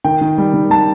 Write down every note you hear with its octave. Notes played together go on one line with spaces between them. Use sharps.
D#3 G5
D#3
G3
D#3
G3 A5